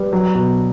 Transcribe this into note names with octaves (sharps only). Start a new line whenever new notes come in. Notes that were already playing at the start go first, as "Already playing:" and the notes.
Already playing: G3 B4
F#3
B2